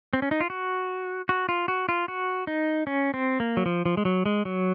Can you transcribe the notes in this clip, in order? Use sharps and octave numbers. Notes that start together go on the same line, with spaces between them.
C4
C#4
D#4
F4
F#4
F#4
F4
F#4
F4
F#4
D#4
C#4
C4
A#3
F#3
F3
F3
G#3
F#3
G#3
F#3